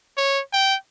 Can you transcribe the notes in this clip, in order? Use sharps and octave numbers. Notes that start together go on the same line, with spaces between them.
C#5
G5